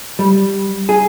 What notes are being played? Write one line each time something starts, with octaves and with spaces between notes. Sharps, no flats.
G3
G#4